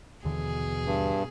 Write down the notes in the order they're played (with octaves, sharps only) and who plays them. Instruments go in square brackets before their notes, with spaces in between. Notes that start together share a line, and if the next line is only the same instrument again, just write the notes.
[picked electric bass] D#2 D3 E3 [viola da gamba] B2 G#4
[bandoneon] G2